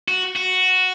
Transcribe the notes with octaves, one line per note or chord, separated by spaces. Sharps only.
F#4
F#4